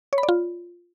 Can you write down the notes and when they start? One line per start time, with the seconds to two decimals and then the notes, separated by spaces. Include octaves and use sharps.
0.13 C#5
0.18 B5
0.23 D5
0.29 F4